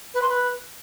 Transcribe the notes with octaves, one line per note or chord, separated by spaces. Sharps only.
B4
C6
B4